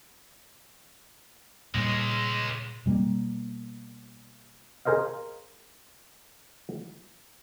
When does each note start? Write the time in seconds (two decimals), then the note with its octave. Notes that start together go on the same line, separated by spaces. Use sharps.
1.74 C#2 A#2 G3 G#3
2.86 B2 G3 A3 A#3
4.85 G#4 A#4 C5 D#5 F5